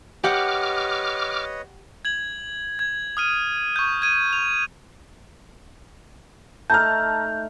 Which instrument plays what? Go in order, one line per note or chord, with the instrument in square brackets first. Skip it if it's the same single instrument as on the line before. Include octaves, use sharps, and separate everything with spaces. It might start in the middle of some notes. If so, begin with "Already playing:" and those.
[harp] G4 F#5 [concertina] B4 C#5 D#5 [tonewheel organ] D6 F6
[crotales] G#6 F#7
G#6
D#6 F6 D#7
C#6 G6
G#6 D#7
F7
[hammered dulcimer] A3 D#4 [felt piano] A5 A#5 F6 [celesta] G6